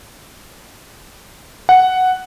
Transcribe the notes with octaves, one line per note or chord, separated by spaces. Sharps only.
F#5